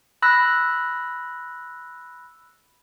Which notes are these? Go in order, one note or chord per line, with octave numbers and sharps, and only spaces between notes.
B5 E6 F#6 A#6